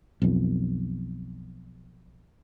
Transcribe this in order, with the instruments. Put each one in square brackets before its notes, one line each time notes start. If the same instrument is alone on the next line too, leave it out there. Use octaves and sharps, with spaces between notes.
[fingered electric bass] B1 F2